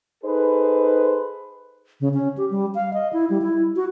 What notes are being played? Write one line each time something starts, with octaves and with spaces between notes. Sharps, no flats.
D#4 G#4 A4 B4 C5
C#3
C#4
G4
G3
F5
D#5
E4
G3
E4
F#4